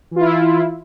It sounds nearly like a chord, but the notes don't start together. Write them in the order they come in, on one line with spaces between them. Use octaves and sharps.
E3 F4 E4